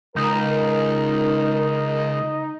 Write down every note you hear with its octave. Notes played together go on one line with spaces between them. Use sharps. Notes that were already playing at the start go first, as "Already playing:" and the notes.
C#2 D#4 A#4